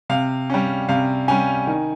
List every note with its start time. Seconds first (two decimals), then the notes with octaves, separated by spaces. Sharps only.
0.10 C3 F5
0.50 G3 C#4
0.89 C3 F5
1.28 G3 C#4 G#5
1.67 D#3